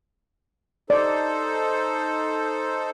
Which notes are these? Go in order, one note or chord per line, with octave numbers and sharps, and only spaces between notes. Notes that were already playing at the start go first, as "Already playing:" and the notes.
D#4 A4 C5 D5